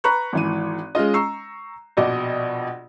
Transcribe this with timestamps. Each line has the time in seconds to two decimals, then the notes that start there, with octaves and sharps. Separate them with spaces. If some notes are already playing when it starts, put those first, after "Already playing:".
0.04 B4 A#5 B5 C#6 F#6
0.33 G#1 E3 D#7
0.95 G#3 C#4 F4 D#5
1.14 A#5 C#6 E6 C7
1.97 A#1 B2 D#5 D6